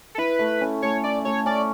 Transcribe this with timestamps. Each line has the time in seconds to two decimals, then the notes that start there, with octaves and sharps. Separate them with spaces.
0.15 A4
0.18 E4 B4
0.39 A3
0.61 C#4
0.82 A3 C#5
1.04 E4 D5
1.25 A3 C#5
1.46 C#4 D5